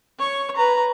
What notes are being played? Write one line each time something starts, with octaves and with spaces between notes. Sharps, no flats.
C#5 C#6
B4 A#5